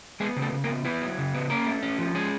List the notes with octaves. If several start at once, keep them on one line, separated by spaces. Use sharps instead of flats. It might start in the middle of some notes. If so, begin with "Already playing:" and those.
G#3 B3 G#4
C#3
A3 A4
C#3
A#3 A#4
B3
B3 E4 B4
F#3
C#3
B3
A#3 C#4 A#4
A3
C#4
F3
G#3 C#4 G#4